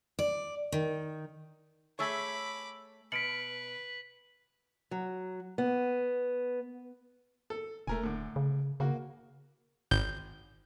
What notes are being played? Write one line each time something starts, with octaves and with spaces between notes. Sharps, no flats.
D5
D#3
A3 G#4 C#5 B5 C#6 D6 E6
B2 B4 B6 C#7 D7 F#7
F#3
B3
A4
E1 A3 A#4 G#5
A2 D3
C#3
C#3 A#3 F#4
G#1 G6